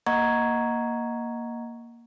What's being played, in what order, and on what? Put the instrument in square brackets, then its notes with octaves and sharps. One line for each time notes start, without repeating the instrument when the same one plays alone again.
[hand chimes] A#3 D#5 F#5 A#5 C#6 G#6